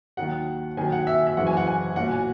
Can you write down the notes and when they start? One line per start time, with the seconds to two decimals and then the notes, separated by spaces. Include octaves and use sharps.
0.17 D#2 D#3 F#3 F#5
0.77 D#2 D#3 F#3 G#5
0.92 F#5
1.07 E5
1.27 E5
1.37 F#1 F#2 C#3 E3 F#5
1.47 G#5
1.57 F#5
1.67 G#5
1.96 B1 A#2 F#3 F#5
2.11 G#5